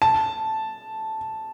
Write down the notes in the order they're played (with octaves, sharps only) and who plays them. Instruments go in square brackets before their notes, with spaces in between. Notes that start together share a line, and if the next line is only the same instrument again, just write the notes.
[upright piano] A5